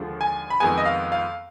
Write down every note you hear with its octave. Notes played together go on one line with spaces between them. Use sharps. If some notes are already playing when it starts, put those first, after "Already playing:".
Already playing: D#2 D3 F3 G#3
G#5
B5
F2 D#3 G#3 B3 G#5
D#5
F5
F5